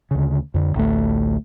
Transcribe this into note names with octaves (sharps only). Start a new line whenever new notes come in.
D2 C#3
F2 D3
A1 D2 A3